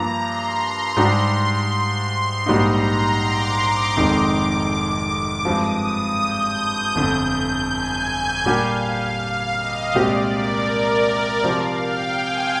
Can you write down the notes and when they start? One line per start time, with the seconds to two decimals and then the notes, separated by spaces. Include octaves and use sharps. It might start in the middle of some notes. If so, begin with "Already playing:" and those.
Already playing: G2 F3 A#3 F4 A#5
0.22 C6
0.60 A#5
0.97 G#2 G3 D4 G4 C6
1.35 C6
2.46 A#1 G#2 G3 A#3 D#4 A#5
2.84 C6
3.22 D6
3.58 A#5
3.96 F1 F2 D#3 G#3 D#4 D6
5.45 G2 F3 G#3 C4 D#6
6.20 G6
6.95 G1 F2 D3 G6
7.70 G#5
8.45 A#2 G3 D4 G4 A#4 F5
8.82 F5
9.56 D#5
9.94 C2 A#2 G#3 C4 G4 D5
10.32 A#4
10.69 D5
11.43 C3 F3 C4 F5
11.81 G5
12.19 G#5